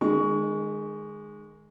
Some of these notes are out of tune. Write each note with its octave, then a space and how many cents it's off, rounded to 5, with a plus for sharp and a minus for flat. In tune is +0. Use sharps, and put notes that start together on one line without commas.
D#3 -35 G#3 +0 C#6 +20